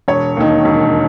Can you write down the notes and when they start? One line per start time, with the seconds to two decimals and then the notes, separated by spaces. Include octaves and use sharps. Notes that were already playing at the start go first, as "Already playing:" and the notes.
0.08 E1 C#5
0.37 D#2 D#3
0.65 E1